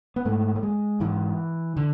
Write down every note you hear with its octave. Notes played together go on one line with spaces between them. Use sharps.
B3
G#2 A3
A3
G#3
G#2 E3
D3